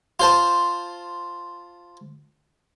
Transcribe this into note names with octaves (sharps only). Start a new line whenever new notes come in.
F4 C5 A5